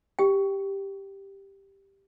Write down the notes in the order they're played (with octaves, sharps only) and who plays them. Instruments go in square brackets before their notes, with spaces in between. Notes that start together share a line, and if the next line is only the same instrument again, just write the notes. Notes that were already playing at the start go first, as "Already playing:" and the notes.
[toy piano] G4 G5